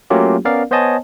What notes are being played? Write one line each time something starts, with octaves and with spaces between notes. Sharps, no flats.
F#3 A3 A#3 C#4 F4 G4
B3 C#4 A#4 D5 F5
B3 C5 C#5 D#5 G#5 A5